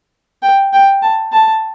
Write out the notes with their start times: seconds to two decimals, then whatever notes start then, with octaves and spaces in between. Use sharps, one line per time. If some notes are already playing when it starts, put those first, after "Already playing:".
0.43 G5
0.73 G5
1.03 A5
1.33 A5